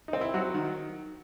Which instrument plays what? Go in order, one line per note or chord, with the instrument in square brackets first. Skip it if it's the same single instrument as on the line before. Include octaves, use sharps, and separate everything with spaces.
[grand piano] D#4
C4
E4
F#3 F#4
D#3